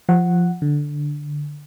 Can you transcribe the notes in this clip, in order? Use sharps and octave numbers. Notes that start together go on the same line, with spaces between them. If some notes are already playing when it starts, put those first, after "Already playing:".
F3 F#5
D3